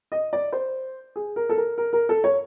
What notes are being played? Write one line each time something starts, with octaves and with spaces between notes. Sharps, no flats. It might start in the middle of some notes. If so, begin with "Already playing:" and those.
D#5
D5
C5
G#4
A#4
A4
A#4
A#4
A#4
A4
C#5